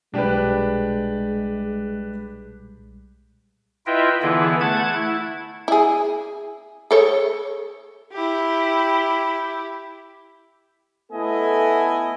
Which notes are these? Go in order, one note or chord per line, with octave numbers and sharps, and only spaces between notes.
B1 A#2 G3 G#3 D4 G4 B4
E4 F4 B4 D#5 E5 G5
D3 E3 B3 E4 G#4 B4
A3 F#5 A5 G#6
E4
E4 G#4
G#4 A4 C#5
E4 G4
A3 B3 E4 A4 D#5 G#5